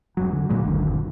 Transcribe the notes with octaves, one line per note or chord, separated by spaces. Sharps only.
E1 G2 F#3
D3
A#2 F#3 G#3
F#1 D2 D3 D#3